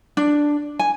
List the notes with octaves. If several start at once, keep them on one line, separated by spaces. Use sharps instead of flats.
D4
G#5